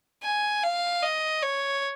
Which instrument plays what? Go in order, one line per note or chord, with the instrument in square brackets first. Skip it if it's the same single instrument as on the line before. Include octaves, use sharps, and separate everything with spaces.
[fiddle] G#5
F5
D#5
C#5